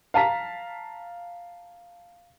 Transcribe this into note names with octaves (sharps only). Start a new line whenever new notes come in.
F5 A5 A#5 B6